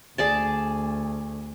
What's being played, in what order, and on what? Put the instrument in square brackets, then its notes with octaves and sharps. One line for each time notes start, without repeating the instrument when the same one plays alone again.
[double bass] D2 [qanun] G#4 D5 A5